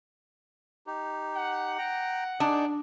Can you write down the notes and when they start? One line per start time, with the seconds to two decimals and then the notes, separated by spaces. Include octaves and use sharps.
0.87 D#4 G4
1.35 F#5
1.78 G5 A#5
2.40 D4 D#4 G#4 D5